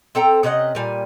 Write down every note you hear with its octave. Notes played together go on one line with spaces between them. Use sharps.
C4 A4 G5 A#5
C3 C#4 D#5 F#5
A#2 G3 G#5